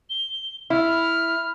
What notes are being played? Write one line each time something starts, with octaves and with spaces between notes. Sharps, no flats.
G7
E4 F6